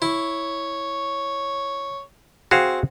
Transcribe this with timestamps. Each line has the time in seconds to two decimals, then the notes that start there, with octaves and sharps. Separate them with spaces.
0.02 E4 C#5
2.51 C4 F#4 G#4 F5